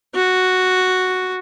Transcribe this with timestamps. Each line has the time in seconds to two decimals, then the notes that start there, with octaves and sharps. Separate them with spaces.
0.15 F#4